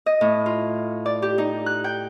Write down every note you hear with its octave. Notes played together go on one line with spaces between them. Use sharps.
D#5
A2
F4
D5
G4
D#4
F#6
G5